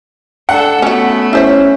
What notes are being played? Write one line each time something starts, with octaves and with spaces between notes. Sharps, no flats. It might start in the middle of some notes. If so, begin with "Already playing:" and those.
D4 A4 F#5
A3 B3 C#4 F#4
C#4 E4 C5 E5